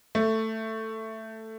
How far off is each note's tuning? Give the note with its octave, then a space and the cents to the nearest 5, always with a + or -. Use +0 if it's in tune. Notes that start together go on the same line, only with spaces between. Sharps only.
A3 +10